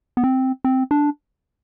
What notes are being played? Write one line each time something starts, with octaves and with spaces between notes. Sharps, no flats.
B3
C4
C4
D4